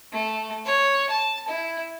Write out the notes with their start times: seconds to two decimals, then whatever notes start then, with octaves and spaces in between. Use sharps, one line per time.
0.12 A3
0.65 C#5
1.10 A5
1.48 E4